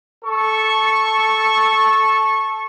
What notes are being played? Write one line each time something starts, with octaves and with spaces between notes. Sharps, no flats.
A4 C#6